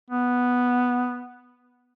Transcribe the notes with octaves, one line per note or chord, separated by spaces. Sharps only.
B3